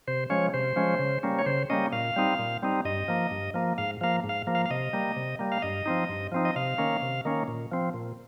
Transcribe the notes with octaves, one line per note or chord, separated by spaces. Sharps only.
C3 C5
F3 G#3 C#4 C#5
C3 C5
F3 G#3 C#4
C#3
G3 A#3 C#4
C#5
C#3 C5
G3 A#3 C#4 D#5
A#2 F5
G3 C4 D#4
A#2
G3 C4 D#4
G2 D#5
F3 A#3
G2
F3 A#3
G#2 F5
F3 A#3 F5
G#2
F5
F3 A#3
F5
F5
C3 D#5
G3 A#3
C3
G3 A#3
F5
G2 D#5
F3 C4 D#4
G2
F3 C4 D#4
D#5
C3 F5
D#3 A#3 C#4
C3
D#3 A#3 C#4
A#2
F3 C4
A#2